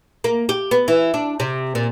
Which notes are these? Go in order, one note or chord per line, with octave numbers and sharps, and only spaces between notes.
A#3
G4
B3
E3
D4
C3
A#2